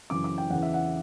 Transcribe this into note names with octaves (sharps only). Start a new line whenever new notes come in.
F#2 C#3 E3 D6
D6
G5
E2 C#3 E3 F#5
E5
F#5